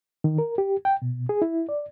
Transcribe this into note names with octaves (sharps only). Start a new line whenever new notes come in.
D#3
A#4
G4
G5
B2
G#4
E4
D5